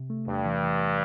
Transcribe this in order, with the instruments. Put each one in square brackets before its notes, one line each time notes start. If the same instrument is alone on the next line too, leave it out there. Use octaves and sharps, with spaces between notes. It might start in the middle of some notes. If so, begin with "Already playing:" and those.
Already playing: [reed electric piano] C3
A3
[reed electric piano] E2 [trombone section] G2
[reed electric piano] E3
E3